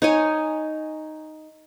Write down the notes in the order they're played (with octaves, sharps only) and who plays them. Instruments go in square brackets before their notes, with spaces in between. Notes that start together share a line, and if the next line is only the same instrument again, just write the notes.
[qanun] D#4 C#5 G#5